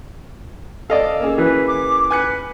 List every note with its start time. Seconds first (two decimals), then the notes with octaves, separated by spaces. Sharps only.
0.90 A4 D5 D#5 F5 E6
1.20 A#3 C#4 G#4
1.38 E3 B4
1.67 D6
2.11 B4 G#5 F#6 C#7